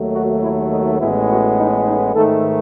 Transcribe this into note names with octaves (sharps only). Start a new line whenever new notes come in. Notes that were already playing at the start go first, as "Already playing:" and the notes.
Already playing: D#2 D#3 F#3 A3
F#4
E4
D#4
A1 A2 G#3 B3 E4
F#4
D#4
D#4
G#2 D#3 A3 A4